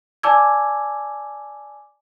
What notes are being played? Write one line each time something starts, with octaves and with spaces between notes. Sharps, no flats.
D5 G#5 A5 D6 E6 G#6